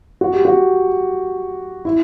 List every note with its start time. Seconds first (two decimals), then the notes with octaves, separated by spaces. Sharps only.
0.21 F#4
0.33 G4
0.45 F#4
1.85 E4